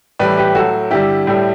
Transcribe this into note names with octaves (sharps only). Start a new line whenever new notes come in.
A2 E3 G3 B4 D5
G4 B4
A2 F#3 F#4 A4
G2 D3 G3 E4 G4
A2 G3